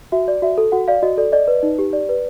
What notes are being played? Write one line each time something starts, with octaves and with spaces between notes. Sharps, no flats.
F#4 E5
D5
F#4 E5
A4
F#4 F#5
D5 F5
F#4 D#5
A4 D5
D5 D#5
B4
D#4
G4
D5
B4